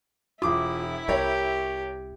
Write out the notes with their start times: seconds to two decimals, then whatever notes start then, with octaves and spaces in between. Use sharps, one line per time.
0.42 E1 E4 F4 D6 D#6
1.08 C2 G4 A#4 C#5